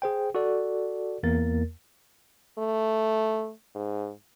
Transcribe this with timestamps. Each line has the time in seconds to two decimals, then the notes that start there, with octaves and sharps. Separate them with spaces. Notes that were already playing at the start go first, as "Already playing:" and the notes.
0.02 G#4 C5 G5
0.35 F#4 A4 D5
1.23 E2 A#3 A#4 A6
2.58 A3
3.75 G#2